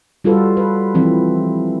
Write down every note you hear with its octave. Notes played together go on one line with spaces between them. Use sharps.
G3 F4 F#4 A4 B4
B4
E3 F3 C4